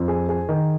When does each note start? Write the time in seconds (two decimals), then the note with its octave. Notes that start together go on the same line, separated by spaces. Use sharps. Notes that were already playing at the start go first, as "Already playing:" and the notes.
Already playing: F2
0.08 G#4
0.29 G#4
0.49 D#3